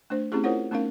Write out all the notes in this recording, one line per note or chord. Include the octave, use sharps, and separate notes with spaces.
A3 D4 C5
A3 C4 C#4 E4 G4 G#4
E4 F4 A#4 C5 C#5 F#5
A3 B3 C#4 D#4 A#4 F5